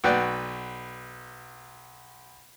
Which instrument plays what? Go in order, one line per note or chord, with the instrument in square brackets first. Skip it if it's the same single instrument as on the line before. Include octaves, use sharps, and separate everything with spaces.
[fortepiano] B1 F#4 B4 D5 G5